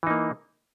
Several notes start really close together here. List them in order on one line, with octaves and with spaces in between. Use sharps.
E3 D#4 A#3